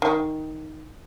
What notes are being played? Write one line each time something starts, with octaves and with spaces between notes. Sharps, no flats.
D#3